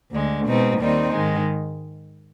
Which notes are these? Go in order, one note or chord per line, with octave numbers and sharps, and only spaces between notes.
D2 D3 G#3
B2 G#3 C4 D#4
D#2 D#3 G3 C4 D#4
G#2 D#3 G#3